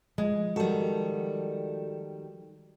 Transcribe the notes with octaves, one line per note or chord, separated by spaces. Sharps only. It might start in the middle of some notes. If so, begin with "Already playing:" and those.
F3 G#3
D#3 G3 F#4 A4